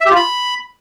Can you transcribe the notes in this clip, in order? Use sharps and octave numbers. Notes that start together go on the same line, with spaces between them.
E5
G4
F4
B5